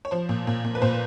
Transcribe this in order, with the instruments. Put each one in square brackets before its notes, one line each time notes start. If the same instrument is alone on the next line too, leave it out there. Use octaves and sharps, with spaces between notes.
[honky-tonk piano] C#5
F3 C5
A#2
A#2
A#2
B4
A#2 C5